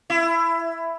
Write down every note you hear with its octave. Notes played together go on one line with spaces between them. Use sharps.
E4